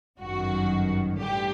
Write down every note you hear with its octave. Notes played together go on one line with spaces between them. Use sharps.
G1 F#2 D#3 F#4
A1 G2 D3 G4